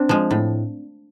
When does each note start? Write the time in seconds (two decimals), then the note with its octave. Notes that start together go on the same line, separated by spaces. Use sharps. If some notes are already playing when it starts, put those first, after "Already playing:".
Already playing: C4 D4
0.09 F3 G#3
0.31 A2